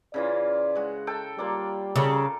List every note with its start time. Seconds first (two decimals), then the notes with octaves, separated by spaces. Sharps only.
0.14 C#3 E3 F4 D5
0.75 G#3 F#4
1.07 A4 G5 A5
1.39 G3 A#3 F4 D5
1.96 C#3 A4 A#4 D6